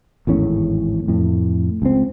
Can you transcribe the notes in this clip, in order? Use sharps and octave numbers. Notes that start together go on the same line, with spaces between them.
G#1 E2 A2 C#4
F2 A2
C#2 C4